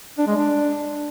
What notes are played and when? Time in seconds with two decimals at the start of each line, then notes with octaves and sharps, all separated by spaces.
0.18 D4
0.27 G#3
0.36 D4